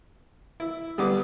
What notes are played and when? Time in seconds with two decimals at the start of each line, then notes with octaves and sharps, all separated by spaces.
0.60 E4
0.98 D3 G3 B3 D6 D#6